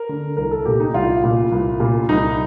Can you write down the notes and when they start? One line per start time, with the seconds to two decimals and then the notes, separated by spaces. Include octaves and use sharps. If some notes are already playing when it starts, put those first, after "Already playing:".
Already playing: A#4
0.09 D3
0.37 C2 A#4
0.51 A4
0.65 A#2 G4
0.80 D#4
0.94 C2 F4
1.24 A#2
1.52 C2
1.80 A#2
2.09 C2 D#4